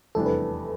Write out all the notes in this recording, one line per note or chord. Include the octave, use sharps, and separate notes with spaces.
F1 E2 C3 G3 D4 A4
B4